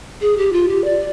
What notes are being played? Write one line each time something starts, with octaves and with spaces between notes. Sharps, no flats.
G#4
G4
F4
G4
D5